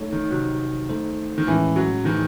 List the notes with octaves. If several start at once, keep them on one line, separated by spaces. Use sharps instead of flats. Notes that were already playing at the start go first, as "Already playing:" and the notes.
Already playing: A3 D#4 A4 C#5
D#3
C3 F#3 C4 D#4 F#4
A3 D#4 A4 C5
D#3
A2 E3 G#3 C#4
F#3
A2 D#3 E3 C4 E4 G#4